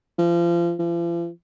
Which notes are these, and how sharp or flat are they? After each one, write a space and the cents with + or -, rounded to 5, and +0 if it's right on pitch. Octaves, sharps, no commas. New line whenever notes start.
F3 -30
F3 -45